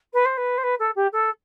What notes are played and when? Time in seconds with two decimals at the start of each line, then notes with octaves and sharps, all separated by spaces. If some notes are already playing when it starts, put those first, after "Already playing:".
0.13 B4
0.25 C5
0.37 B4
0.57 C5
0.63 B4
0.79 A4
0.95 G4
1.12 A4